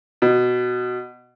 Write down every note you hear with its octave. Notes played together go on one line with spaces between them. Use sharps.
B2